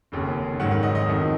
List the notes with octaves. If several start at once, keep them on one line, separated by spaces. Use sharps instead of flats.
F1 D#2 C#3
G#1 G#2 D#3 F#3 F#5
F#5
D#5
D#5
F1 F2 D#3